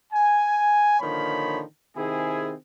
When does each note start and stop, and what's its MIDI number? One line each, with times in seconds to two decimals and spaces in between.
0.12 0.97 80
1.00 1.62 46
1.00 1.62 50
1.00 1.62 51
1.00 1.62 53
1.00 1.62 73
1.00 1.62 83
1.96 2.54 48
1.96 2.54 51
1.96 2.54 60
1.96 2.54 64
1.96 2.54 68